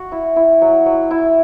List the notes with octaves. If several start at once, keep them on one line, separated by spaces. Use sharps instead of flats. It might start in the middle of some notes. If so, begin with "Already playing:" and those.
Already playing: F#4
E4
E4
F#3
F#3
E4